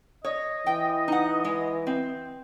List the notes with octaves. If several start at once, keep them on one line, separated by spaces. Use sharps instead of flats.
C#5 D#5
E3 G5
D#4 F#5
G#3
C4